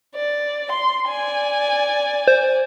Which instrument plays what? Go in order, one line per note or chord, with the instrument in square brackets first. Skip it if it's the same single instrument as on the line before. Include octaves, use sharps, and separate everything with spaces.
[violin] D5
C6
D5 G#5
[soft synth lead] C5